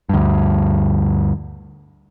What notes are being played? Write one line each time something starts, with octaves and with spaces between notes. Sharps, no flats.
D2 G2